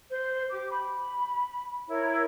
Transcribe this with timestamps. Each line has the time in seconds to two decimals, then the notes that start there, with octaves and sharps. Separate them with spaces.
0.10 C5
0.50 G4 D6
0.70 B5
1.88 E4 A#4 C#5